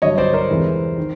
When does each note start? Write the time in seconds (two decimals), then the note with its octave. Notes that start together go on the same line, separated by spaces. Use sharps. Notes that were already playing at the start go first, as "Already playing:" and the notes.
0.02 G2 D3 F#3 C#5 D#5
0.18 C5 D5
0.34 A#4 C5
0.50 E2 C3 E3 G#3
0.98 D#3